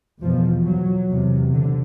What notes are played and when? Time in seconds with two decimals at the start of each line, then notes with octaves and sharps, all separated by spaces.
0.21 E2 B2 F3
0.66 F#3
1.09 E2 C3
1.54 D3